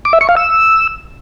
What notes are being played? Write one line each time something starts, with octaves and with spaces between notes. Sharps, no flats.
D6
E5
C#6
F5
E6